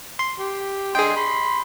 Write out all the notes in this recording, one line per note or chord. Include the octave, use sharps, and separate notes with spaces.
C6
G4
D3 G#4 D#5 G5 C6
B5 C6